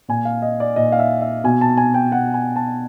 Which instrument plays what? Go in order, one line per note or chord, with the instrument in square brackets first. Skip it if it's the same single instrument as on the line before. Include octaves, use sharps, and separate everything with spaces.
[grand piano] A#2 G#5
F5
D#5
D5
A#2 D#5
F5
E5
E5
B2 G#5
A5
G#5
G5
B2 F#5
G#5
A5